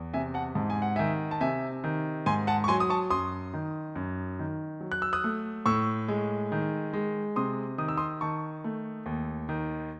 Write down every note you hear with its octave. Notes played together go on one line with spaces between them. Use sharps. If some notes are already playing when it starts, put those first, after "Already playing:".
Already playing: E2
C3 E5 G#5
F#5 A5
G#2 A5
G#5
F#5
D#3 E5 G#5
A5
C3 E5 G#5
D#3
G#2 G#5 C6
F#5 A5
C#6
F#3 G#5 C6
D#6
A5 C#6
F#2 C6 D#6
D#3
F#2
D#3
F#3
F#6
E6
D#6 F#6
A3
A2 C#6 E6
G#3
D#3
G#3
C3 C6 D#6
D#3 D#6
E6
C6 D#6
D#3 A5 C#6
A3
D#2
D#3